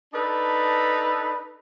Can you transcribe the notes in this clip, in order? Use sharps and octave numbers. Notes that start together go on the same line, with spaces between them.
D4 D#4 A4 B4